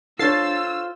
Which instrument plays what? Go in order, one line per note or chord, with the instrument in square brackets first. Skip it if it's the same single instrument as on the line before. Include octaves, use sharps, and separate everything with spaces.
[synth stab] D4 A6 C7 [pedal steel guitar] F4 C5 [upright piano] A4 C#5 [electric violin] E6